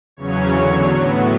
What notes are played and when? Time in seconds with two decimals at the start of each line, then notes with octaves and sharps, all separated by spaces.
0.17 E2 C#3 F#3 C#4 C#5
0.52 E2 D3 F#3
0.88 A2 F#3 B3